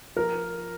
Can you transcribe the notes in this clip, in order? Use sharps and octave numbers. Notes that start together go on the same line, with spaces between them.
F3 A#4